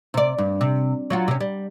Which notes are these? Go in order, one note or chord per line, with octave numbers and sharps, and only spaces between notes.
C3 D5
G2
C3
F#3 F4 F#4
C3 C#4
G3